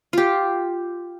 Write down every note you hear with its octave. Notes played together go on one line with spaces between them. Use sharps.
F4 G4